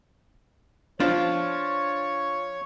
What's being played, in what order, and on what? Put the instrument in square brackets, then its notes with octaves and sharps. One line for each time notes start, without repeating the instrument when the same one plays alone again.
[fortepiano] F3 F4 [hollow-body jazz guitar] D4 [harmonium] C#5